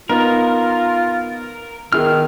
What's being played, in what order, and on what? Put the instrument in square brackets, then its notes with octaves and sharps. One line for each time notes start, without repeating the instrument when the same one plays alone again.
[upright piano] B3 D#4 [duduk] F4 [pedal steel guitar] A#4
[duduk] D#3 [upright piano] B3 E4 G#4 [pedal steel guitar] F6